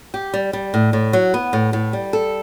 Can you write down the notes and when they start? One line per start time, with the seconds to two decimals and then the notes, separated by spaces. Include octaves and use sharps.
0.14 G4
0.34 G3
0.53 G3
0.74 A2
0.93 A2
1.13 F#3
1.34 B3
1.53 A2
1.73 A2
1.93 G3
2.13 A4